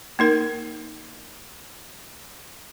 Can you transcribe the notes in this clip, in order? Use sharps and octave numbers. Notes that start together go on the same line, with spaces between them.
A#3 D#4 A#4